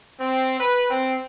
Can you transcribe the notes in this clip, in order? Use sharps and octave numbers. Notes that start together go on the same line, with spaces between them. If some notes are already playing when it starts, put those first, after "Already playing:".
C4
B4
C4